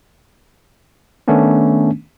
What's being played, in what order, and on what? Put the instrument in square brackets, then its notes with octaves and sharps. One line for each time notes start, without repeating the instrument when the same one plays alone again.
[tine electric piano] D#3 A3 B3 C#4 D4